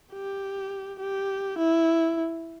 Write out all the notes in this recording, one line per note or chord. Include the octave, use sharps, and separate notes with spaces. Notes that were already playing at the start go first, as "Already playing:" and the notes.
G4
G4
E4